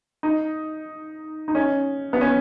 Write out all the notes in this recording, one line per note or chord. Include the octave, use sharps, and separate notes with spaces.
D#4
D#4
C#4
B3
C#4